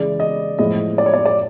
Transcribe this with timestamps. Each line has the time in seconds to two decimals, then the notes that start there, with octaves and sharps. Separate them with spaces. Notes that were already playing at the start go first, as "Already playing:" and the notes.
Already playing: C#3 E3 G#3 D5
0.20 D#5
0.59 A2 F3 G#3 D#5
0.98 D5
1.06 C#5
1.14 D5
1.26 D5